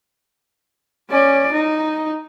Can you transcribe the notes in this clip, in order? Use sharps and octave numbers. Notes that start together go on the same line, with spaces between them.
C#4 D5
D#4